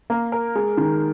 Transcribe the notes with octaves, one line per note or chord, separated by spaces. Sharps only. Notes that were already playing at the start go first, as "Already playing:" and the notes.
A#3
A#4
G#3
D#3